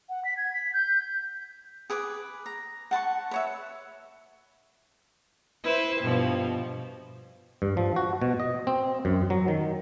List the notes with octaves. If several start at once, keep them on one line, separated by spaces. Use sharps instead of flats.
F#5
B6
G#6
B6
G6
G#4 B4 G#5 D6
A#5
F#5 A5 B5 C#6
B4 C#5 E5
E4 B4 C5
G2 B2 F3
G2
F3
F#4
B2
D#5
C4
F#2
F#3
D#3